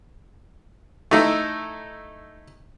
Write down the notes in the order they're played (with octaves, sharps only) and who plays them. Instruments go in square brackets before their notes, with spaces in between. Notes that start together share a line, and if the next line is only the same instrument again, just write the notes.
[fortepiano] A3 D#4 E4